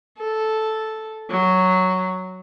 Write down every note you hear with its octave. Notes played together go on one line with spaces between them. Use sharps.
A4
F#3